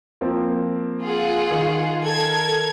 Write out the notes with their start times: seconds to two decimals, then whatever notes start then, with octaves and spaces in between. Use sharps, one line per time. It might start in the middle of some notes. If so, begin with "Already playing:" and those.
0.21 F3 A#3 C4
1.02 F4 G#4 F#5
1.51 D#3
2.02 A4 A#4 G#6